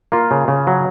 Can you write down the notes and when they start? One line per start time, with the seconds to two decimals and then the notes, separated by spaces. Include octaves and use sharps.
0.12 A#3 F4
0.31 C#3
0.48 C#3
0.67 F#3